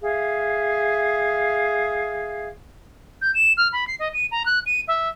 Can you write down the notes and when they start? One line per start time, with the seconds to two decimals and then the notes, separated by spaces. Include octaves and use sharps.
0.02 G#4 E5 F5
3.21 G6
3.34 E7
3.57 F6
3.73 B5
3.87 C7
3.99 D#5
4.13 D#7
4.31 A#5
4.46 F#6
4.66 D#7
4.88 E5